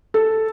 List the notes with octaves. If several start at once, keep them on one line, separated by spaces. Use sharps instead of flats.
A4